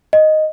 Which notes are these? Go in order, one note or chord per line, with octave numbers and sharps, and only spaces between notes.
D#5